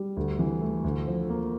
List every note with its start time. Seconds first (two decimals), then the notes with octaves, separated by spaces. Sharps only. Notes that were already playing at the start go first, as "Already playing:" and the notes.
Already playing: G3
0.17 D2
0.39 E3
0.61 A3
0.84 D2
1.07 F3
1.30 A#3